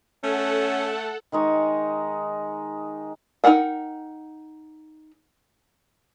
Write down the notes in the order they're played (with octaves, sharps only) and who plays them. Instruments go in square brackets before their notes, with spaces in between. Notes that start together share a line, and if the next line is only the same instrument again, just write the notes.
[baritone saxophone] A3 [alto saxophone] C#4 [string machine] A4 F#5
[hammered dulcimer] D#3 G#3 D#4 C#6
[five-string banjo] D#4 F#4 A#4 F#5 G5